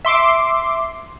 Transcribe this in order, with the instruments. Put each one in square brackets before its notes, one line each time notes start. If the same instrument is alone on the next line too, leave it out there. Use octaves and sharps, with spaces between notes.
[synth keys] E5 C6 D6